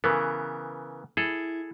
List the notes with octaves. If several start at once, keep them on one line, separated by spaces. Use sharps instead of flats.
C#3 E3 B3 A#4
E4 G#4 A4